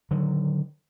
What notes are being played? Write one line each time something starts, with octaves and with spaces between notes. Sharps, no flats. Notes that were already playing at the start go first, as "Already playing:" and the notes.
D3 D#3 F#3